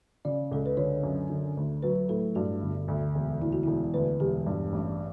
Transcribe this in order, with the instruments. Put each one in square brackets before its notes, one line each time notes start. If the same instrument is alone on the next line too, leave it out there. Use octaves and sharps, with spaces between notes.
[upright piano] C#3 [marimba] D5
[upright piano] C#2 [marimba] A4
[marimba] B4
[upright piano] D3 [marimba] C#5
[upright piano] F#2
D3
D2
[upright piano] F#3 [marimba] B4
[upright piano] A2 [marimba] A4
[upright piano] G2 [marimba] F#4
[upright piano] G1
D2
E1
[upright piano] D2 [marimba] E4
[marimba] F#4
[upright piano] E1 [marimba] E4
[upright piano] D2 [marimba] B4
[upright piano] E1 [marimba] G4
[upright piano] G2
A1